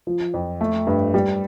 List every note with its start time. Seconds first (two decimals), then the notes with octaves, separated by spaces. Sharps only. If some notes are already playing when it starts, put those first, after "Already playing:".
0.07 F3
0.34 F2
0.61 A3
0.87 G2
1.14 G3